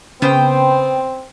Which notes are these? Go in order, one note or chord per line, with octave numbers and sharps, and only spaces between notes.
C#3 B3 C4 C5 G5